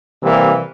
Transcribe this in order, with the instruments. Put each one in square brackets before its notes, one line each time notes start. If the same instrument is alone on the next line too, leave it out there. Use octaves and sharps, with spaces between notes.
[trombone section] C3 E3 G3 A#3